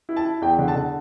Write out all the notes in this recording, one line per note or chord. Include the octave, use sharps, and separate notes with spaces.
E4
A5
E4
E2 G5
D3
A5
D3